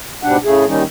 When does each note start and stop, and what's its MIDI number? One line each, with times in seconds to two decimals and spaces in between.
0.23 0.37 44
0.23 0.37 47
0.23 0.37 55
0.23 0.37 62
0.23 0.37 78
0.44 0.65 45
0.44 0.65 49
0.44 0.65 57
0.44 0.65 68
0.68 0.83 39
0.68 0.83 51
0.68 0.83 55
0.68 0.83 61
0.68 0.83 63